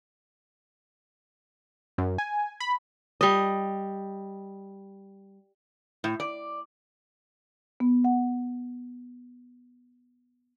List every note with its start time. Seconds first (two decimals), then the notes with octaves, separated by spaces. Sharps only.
1.98 F#2
2.18 G#5
2.60 B5
3.21 G3 D#5
6.04 A2
6.20 D5
7.80 B3
8.04 F#5